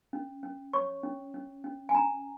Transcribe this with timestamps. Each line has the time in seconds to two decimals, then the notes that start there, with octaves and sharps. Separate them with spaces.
0.13 C#4
0.43 C#4
0.73 C#5 C#6
1.03 C#4
1.34 C#4
1.64 C#4
1.89 G#5
1.95 C#4 A#5